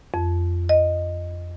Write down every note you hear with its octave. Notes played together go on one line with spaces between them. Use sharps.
F2
D#5